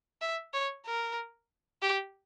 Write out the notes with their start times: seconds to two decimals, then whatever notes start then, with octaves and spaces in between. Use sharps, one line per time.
0.21 E5
0.54 C#5
0.86 A#4
1.82 G4